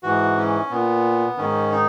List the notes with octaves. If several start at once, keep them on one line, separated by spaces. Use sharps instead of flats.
G#2 E3 F#4
C#4
A#2 B3
G#2 D#3 C#4
D#4